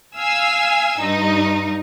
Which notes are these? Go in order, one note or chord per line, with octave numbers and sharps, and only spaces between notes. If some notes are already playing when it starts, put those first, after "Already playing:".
F5 G#5 E6
G2 D#4